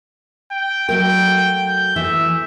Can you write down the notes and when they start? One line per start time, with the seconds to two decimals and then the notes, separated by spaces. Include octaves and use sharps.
0.51 G5
0.89 F#3 A3 A#4 G5
1.67 G6
1.96 E3 A3 E5